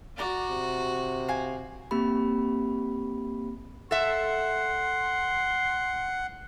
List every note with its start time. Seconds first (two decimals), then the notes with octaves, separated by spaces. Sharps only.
0.18 F#4 D5 A#5 D6
0.51 C3
1.28 F5 G5 G#5
1.91 A#3 C4 G4 B5
3.91 A4 E5 F#5 C6